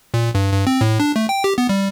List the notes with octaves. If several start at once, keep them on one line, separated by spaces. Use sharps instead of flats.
A#2
G2
G2
C4
A2
D4
A3
G5
G4
B3
G3